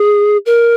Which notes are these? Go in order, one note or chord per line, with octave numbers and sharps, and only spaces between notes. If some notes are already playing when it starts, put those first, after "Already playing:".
Already playing: G#4
A#4